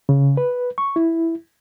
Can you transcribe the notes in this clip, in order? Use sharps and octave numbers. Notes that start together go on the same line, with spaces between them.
C#3
B4
C#6
E4